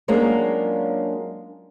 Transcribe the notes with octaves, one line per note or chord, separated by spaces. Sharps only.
F#3 G#3 A#3 C#4 D4 F4